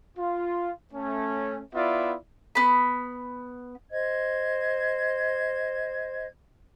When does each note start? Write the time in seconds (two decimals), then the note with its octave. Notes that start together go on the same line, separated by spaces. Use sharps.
0.18 F4
0.94 A3 C#4
1.74 B3 E4 F4 D5 E5
2.55 B3 B5
3.90 C5 D#5 G#6